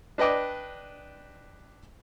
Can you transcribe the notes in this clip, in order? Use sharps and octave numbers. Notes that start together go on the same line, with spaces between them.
D4 B4 D#5 G5 D6